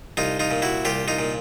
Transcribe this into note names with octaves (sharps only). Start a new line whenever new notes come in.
C2 D#4 F4
D#4 F4
A#2
E4 F#4
C2 F4 G4
D#4 F4
A#2